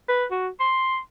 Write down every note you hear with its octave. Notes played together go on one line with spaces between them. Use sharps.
B4
F#4
C6